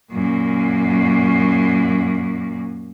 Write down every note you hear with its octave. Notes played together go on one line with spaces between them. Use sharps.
F#2 A#2